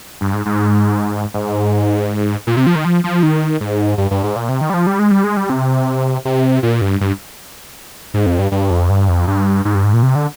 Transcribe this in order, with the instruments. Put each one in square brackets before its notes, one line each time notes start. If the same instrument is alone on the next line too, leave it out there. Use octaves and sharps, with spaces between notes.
[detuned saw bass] G2
G#2
G#2
G#2
A#2
C3
F3
D#3
F3
F3
D#3
G#2
G2
G2
G#2
A#2
C3
D#3
G3
F3
G3
G#3
G3
G#3
G3
C3
C3
A#2
G2
G2
G#2
F2
G2
G2
F2
G2
F2
G2
G#2
G2
G#2
A#2
C3
D3